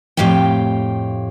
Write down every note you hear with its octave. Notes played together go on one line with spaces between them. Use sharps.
F2 A2 G4 F5 G5